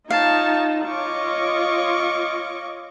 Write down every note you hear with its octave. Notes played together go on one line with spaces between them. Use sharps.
D#4 F4 C#5 F5 A5
F4 C#5 D#5 C#6 D6